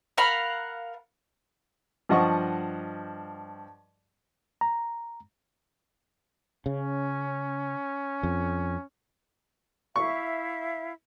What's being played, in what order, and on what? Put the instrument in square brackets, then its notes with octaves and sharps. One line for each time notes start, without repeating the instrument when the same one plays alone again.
[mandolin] A#4 F5 F#5 B5
[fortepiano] G2 F3 D#5 F#5 A5 C#6
[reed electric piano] A#5
[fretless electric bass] C#3 [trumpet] C#4
[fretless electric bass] F2
[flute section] E4 E5 F5 [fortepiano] C#6